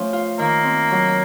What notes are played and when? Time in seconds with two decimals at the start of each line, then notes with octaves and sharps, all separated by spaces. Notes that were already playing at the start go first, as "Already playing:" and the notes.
Already playing: F3 A3 C#4
0.13 F4
0.38 D#3 A#3
0.64 C4
0.91 F#3